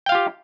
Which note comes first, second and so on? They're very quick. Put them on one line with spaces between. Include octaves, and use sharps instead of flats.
G5 F5 F4 G4